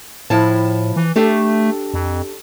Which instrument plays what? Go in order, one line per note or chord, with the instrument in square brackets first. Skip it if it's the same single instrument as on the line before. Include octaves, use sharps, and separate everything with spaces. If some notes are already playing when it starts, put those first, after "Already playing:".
[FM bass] A2 [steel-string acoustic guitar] F3 E4 A5
[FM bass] E3
[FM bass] A3 [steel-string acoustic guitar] D4 G4 A4
[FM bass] F2